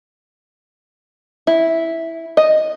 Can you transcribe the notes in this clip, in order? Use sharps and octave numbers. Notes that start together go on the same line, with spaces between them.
E4
D#5